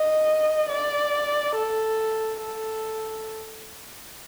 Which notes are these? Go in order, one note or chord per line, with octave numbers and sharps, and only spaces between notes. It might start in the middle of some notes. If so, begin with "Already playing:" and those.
Already playing: D#5
D5
A4
A4